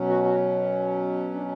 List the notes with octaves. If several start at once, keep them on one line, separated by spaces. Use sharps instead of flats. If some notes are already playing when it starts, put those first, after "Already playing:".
Already playing: B2 F#3 C#4
F#4
F#4
D4